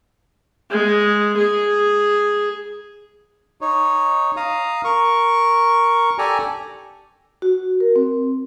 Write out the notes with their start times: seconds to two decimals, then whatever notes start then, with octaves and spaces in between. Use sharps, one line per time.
0.70 G#3
1.37 G#4
3.61 D#4 C#5
4.37 F5 A#5 D#6
4.84 A#4 C#6
6.18 G4 A4 D5 G#5 A#5
7.42 F#4
7.80 A#4
7.96 C4